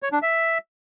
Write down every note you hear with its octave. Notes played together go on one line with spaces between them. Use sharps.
C#5
D4
E5